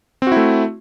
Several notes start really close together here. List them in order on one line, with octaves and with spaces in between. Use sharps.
C4 F#4 E4 A3